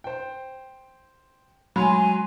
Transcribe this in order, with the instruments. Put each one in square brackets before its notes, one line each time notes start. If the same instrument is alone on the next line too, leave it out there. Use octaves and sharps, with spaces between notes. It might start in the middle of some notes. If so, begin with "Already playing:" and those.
[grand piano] C5 G5
[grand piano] F#3 [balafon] G#3 B5 [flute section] G#5 C6